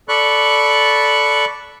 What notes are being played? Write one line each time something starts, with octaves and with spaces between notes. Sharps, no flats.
A4 D5 B5 C#6 F#6